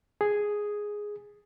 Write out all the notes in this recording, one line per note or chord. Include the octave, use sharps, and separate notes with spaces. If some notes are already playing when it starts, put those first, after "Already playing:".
G#4